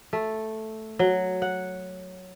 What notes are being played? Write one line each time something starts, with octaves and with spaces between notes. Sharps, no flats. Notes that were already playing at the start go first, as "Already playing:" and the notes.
A3
F#3
F#5